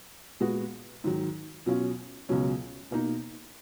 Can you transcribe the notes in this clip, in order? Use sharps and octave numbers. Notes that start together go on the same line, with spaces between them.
A#2 G#3 B3 F#4
G#2 D#3 F#3
B2 F#3 C#4 F4
C#2 B2 F#3 C#4
B2 A#3 D#4